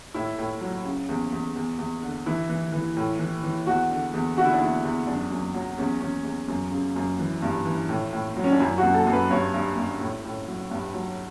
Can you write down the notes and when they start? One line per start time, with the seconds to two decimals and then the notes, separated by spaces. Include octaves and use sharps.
0.14 A2 E4
0.38 A2
0.61 F#3
0.85 C#3
1.09 E2
1.32 E2
1.56 E2
1.79 E2
2.03 D3
2.26 E3 E4
2.50 E3
2.72 E3
2.97 A2
3.19 E3
3.43 E3
3.67 E2 F#4
3.90 D3
4.14 E2
4.37 D3 F#4
4.45 E4
4.53 D4
4.61 E2 E4
4.84 E2
5.07 F#2 D4
5.31 F#2
5.54 F#3
5.78 E2 C#4
6.00 E2 C#4
6.24 E2
6.48 F#2
6.72 C#3
6.96 F#2
7.19 E3
7.42 G2
7.66 E3
7.89 A2
8.13 A2
8.36 F#3
8.44 C#4
8.52 D4
8.60 F#2 E4
8.78 F#4
8.83 F#2
8.94 A4
9.07 F#2
9.13 B4
9.30 G2 C#5
9.54 G2
9.77 G2
10.00 A2
10.25 A2
10.48 F#3
10.71 G2
10.94 F#3